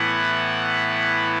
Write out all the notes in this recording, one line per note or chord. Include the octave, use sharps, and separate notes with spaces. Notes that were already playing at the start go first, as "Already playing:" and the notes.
Already playing: A2 E3 B3 E4 F#5